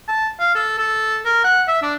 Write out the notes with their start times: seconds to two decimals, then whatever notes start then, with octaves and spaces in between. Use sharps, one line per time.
0.08 A5
0.40 F5
0.55 A4
0.78 A4
1.25 A#4
1.44 F#5
1.68 E5
1.82 D4